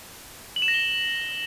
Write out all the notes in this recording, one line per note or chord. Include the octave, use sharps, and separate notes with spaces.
F#7
E7
A#6
G7